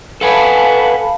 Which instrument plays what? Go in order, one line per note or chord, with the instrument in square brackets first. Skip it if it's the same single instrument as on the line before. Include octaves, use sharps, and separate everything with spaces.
[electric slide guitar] A4 F#5 G#5 [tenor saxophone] B4 [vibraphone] F5 A5 B5